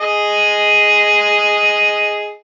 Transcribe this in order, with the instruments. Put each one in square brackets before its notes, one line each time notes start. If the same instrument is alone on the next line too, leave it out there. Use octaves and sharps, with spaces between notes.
[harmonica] G#4 D#5